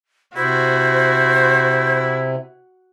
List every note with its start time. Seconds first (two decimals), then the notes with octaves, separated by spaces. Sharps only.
0.36 C3 E4 F#4 C5